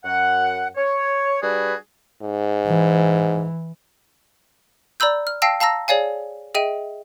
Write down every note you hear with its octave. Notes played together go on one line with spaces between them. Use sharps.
F#2 F#5
C#5
G3 D4 F#4 G#4 B4
G#2
E3
D5 A#5 B5 E6 G6
F6
F5 G5 A5 E6 A#6 C7
F5 A5 A#5 E6 A#6
G#4 C#5 D5 F5 G#5
G#4 D#5 E5 G5 D#7